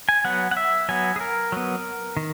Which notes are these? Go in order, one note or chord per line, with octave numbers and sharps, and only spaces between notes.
G#5
F#3 B3 F#5
F#5
E5
F#3 B3 G#5
G#4
A#4
F#3 B3
D#3